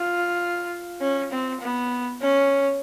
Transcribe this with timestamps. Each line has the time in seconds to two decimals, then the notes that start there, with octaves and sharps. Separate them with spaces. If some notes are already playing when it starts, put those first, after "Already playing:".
Already playing: F4
1.01 C#4
1.32 C4
1.61 B3
2.22 C#4